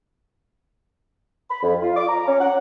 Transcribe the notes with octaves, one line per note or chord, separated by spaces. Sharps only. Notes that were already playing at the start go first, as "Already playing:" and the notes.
B5
F2
F4
D6
A#5
C#4
F#5